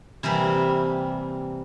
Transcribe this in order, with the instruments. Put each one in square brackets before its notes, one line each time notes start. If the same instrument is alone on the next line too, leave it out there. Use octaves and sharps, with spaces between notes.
[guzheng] C3 E3 G3 A#3